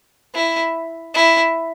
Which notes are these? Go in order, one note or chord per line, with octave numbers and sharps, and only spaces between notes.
E4
E4